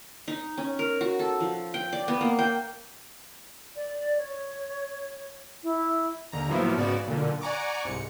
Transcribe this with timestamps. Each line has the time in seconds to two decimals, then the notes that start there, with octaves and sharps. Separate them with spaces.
0.28 D#4
0.58 C#4
0.79 A#4
1.01 F#4
1.19 A4
1.40 F3
1.74 G5
1.93 D5
2.08 B3
2.21 A#3
2.39 G5
3.76 D5
4.18 C#5
5.63 E4
6.32 D#2 D3 A#5
6.49 A2 F3 F#3 A#3 B3 E4
6.77 G#2 C#3 B3 F#4 D5 E7
7.06 B1 A#2 D3
7.41 D5 F#5 G#5 A#5 C#6 D6
7.85 C2 G#2 C#7